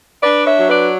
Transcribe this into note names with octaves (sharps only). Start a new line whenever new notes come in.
D4 B4 D5
C#5 E5
F#3
B4 D5